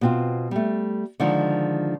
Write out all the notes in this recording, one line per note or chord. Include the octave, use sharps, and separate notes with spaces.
B2 C4 F4
G3 A3
D3 D#3 F3 G#3